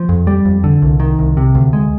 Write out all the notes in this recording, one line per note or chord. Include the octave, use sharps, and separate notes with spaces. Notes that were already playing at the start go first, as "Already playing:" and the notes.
Already playing: F3
F2
G3
F2
D3
C2
D#3
C2
C3
D2
G#3